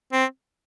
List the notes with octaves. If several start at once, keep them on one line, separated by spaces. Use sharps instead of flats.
C4